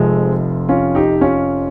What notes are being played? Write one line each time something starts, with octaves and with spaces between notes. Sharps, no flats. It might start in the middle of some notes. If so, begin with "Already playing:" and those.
Already playing: F1 F2 C3 F3 G#3 C4
C#4 F4
D#4 G4
C#4 F4